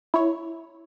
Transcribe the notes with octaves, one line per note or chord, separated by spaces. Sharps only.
E4 C#5